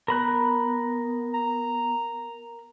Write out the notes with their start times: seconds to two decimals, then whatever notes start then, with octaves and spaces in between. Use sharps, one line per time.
0.08 B3 A#4 B5 F#6
1.34 A#5